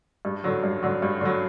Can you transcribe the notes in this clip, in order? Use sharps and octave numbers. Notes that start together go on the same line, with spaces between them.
G2
D3 F#3
G2
D3 F#3
G2
D3 F#3